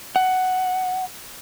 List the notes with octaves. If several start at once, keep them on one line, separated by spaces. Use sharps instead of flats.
F#5